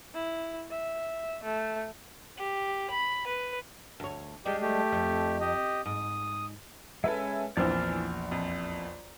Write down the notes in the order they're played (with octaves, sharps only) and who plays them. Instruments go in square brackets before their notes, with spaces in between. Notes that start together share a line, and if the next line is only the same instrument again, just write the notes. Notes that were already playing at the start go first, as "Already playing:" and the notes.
[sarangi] E4
E5
A3
[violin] G4
B5
B4
[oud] D2 C#5
[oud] G3 G#3 D4 [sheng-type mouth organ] G4
[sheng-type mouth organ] A3 G4
[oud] F2
[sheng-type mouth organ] G4 D#5
[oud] G#2 [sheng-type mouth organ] D#6
[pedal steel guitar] G#3 C#4 [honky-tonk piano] A4 B4 E5
[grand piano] A#1 E2 [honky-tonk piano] E3 C4 D4 [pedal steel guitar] D5 A#5 F6
[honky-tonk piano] F2